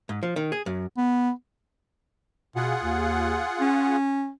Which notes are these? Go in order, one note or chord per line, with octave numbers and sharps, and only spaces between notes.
G#2
F3
D#3
G#4
F#2
B3
B2 F4 G#4 F#5
D#2
C#4